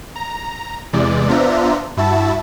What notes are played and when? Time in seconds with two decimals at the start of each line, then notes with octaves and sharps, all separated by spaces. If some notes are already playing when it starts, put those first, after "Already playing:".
0.15 A#5
0.93 E2 C3 E3 G#3 D5
1.28 B3 D4 F4 C5 E5 A#5
1.97 G2 E4 F#4 E5 A5 A6